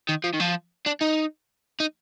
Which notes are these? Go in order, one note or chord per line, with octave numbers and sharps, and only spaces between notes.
D#3
F3
D#3
F3
D4
D#4
D#4